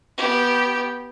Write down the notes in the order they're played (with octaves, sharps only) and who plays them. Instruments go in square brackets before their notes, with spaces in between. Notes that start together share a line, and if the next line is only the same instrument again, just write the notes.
[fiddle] B3 G4